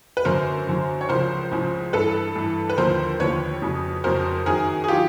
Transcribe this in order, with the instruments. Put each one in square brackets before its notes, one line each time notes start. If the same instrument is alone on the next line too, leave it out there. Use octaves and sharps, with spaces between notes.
[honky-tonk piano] B4
F#2 D3 F#3 A#4 C5
F#2 D3 F#3
C#5
C#2 C#3 F3 A#4 C5
C#2 C#3 F3
G2 E3 A4 B4
G2 E3
B4
D#2 D3 F3 A#4 C5
D#2 D3 F3 B4 C#5
F2 C#3 F#3
F2 C#3 F#3 A#4 C5
F#2 D#3 F#3 G#4 A#4
G#4
D#3 F#3 F4 G4